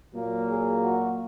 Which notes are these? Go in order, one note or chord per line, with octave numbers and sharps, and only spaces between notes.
A#2 F#3 A#3
G#4
F#4